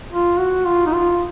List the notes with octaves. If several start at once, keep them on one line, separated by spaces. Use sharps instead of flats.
F4
F#4
F4
D#4
F4